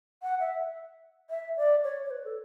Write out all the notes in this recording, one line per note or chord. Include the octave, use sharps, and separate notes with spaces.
F#5
E5
E5
D5
C#5
C#5
B4
A4